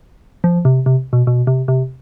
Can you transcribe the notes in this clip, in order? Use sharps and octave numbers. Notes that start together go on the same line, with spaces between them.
F3
C3
C3
B2
B2
C3
C3